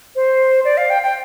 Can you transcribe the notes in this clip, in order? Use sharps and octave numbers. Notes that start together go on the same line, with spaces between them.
C5
D5
F5
G5
G5